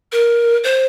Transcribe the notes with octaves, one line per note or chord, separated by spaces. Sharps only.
A#4
C5